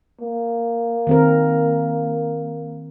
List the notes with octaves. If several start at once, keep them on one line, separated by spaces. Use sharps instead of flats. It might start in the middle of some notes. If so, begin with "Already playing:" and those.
A#3
D#3 C4 A#4